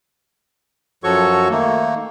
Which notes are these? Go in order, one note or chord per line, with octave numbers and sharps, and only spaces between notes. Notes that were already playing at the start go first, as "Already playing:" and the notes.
F#2 F3 F#4 A4 C#5 C#6
D#3 A3 A#3